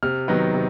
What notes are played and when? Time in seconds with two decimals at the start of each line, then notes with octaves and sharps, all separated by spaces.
0.03 C3 F6
0.28 D#3 F#3 B3 D#4
0.54 C3